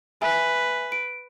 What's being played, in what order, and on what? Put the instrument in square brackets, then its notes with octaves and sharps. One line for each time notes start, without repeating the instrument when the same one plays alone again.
[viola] B4 [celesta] E5 G#5
[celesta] D7